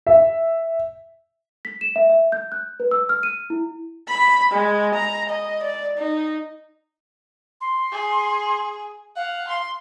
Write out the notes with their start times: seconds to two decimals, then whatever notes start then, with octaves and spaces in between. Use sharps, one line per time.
0.07 E5
1.65 B6
1.81 E7
1.96 E5
2.10 E5
2.32 G6
2.52 F#6
2.80 B4
2.91 E6
3.09 F6
3.23 D#7
3.50 E4
4.08 B5
4.52 G#3
4.95 A#5
5.29 D#5
5.63 D5
5.98 D#4
7.61 C6
7.92 G#4
9.16 F5 F#5
9.48 C6